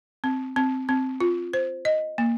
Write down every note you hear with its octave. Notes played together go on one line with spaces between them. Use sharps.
C4
C4
C4
F4
C5
D#5
A#3